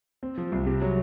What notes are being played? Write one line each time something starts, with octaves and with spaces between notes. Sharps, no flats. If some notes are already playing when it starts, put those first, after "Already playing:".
C4
F3
C2
C3
F#3